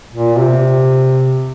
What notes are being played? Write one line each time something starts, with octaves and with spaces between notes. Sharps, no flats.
A#2
C3